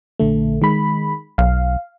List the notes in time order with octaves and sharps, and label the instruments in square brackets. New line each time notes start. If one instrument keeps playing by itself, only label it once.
[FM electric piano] A#1 D3 A3
D#3 G#3 B5
[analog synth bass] B1 [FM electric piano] F5